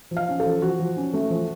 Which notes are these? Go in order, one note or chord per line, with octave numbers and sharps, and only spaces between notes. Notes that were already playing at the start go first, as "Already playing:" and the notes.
F3
F5
C#4
A4
F3
F3 F#4
F3
C#4
A3
F3